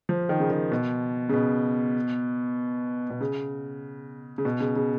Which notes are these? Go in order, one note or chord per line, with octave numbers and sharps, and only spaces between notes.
F3
D#3
C#3
D#3
B2
C#3
B2
B2
C#3
C#3
B2
C#3
C#3